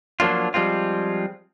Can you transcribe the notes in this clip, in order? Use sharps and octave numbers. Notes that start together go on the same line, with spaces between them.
F3 F#3 A#3 D4 F4
F3 G3 G#3 C4 F4